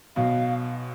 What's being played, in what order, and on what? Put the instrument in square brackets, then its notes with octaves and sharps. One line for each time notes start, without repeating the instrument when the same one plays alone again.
[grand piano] B1 B2 [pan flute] F5